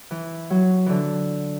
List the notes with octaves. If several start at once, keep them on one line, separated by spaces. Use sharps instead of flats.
E3
F#3
D3 E3